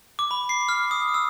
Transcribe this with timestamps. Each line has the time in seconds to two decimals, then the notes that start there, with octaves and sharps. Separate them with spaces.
0.19 D6
0.31 B5
0.49 C7
0.69 F6
0.91 D#6
1.14 E6